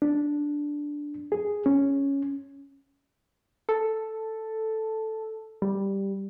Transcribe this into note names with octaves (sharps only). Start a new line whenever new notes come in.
D4
G#4
C#4
A4
G3